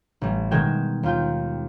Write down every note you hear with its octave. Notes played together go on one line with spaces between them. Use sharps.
A1 G3
B2 D#3 G#3 G5 G#6 E7
D#2 F4 G5